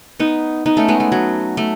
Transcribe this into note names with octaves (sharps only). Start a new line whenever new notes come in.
B3 D#4
B3 D#4
A3 C#4
G#3 B3
A3
F#3
A3